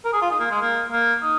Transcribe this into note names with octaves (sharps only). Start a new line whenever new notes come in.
A#4
G#4
F4
D#4
A#3
G#3
A#3
A#3
D#4